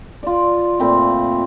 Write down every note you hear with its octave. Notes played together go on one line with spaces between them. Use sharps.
F4 D5
A#2 A3 C4 B5